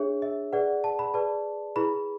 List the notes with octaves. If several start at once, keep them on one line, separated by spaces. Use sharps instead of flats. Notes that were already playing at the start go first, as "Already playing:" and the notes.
Already playing: D4 G#4 C#5 E5
E5
G#4 B4 D5 F#5
A5
B5
G#4 B4 D5 A5
E4 G#4 B4 B5